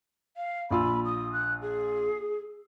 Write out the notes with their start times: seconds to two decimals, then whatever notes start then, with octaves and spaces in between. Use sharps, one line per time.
0.37 F5
0.71 A#1 F4 B5 E6
1.05 D#6
1.33 F#6
1.62 G#4